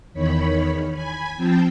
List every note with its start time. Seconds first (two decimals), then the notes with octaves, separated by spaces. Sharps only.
0.13 E2 D#3 C#5 B5
0.93 G#5 B5 G#6
1.37 F3 C4 G5 A5